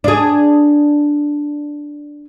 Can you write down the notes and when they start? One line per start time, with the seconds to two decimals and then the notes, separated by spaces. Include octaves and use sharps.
0.04 D4 G#4